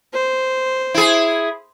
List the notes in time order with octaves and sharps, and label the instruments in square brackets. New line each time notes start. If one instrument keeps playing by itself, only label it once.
[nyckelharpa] C5
[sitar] E4 G#4